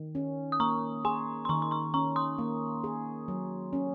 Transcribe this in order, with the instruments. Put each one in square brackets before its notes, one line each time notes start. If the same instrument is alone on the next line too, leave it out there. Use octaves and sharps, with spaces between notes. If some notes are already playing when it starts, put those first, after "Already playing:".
Already playing: [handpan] D#3
C#4
[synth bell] D#6
[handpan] A#3 [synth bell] A#5 C#6
[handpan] G#4 [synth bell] G#5 C6
[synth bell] C6
[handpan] D#3 [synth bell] A#5 C#6
[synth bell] C6
A#5 C#6
[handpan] C#4 [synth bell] A#5 C#6
[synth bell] C6 D#6
[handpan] A#3
G#4
F#3
C#4